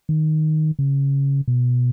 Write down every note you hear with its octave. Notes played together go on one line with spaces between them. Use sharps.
D#3
C#3
B2